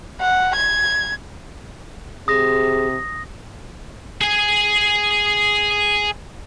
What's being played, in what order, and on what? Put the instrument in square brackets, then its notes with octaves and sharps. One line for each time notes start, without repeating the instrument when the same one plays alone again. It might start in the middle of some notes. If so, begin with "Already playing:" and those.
[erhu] F#5
G#6
[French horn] C3 [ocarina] G#4 [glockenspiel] D#6 A#6
[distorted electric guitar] G#4 G#5